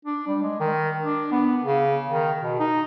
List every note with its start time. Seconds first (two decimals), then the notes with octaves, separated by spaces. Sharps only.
0.05 D4
0.27 G3
0.43 G#3
0.60 D#3
1.02 D4
1.32 B3
1.63 C#3
2.09 D#3
2.42 B2
2.59 D#4